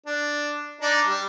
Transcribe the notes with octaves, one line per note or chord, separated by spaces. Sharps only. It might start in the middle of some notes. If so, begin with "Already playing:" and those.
D4
D4 D#4 D5
G3